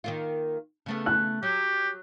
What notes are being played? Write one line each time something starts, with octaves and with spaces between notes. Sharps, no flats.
D#3 A#3 F4
C#3 A3 B3
F#6
F#3 G4